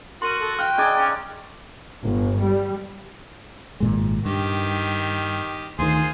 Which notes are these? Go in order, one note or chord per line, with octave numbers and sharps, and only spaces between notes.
F#4 A#4 C6 D#7
A4
F5 G5 C#6 F#6
D#4 G#4 D5 G#5
C#4
G1
G3
G#1 A#2 G#3
G2 D#3 G4
D2 D#3 F4 G#4 C5